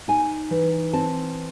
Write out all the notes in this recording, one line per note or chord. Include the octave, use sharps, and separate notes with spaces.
D#4 G#5
E3
C4 A5